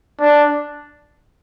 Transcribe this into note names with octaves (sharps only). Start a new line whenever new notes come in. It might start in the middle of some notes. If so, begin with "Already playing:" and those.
D4